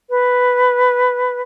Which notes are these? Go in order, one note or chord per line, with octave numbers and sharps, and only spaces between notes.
B4